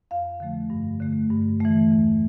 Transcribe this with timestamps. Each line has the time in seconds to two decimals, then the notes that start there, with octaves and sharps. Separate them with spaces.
0.11 F2 F5
0.40 D3 F3 A3
0.70 G2
1.00 D3 A3
1.30 G2
1.60 E3 A3
1.91 E2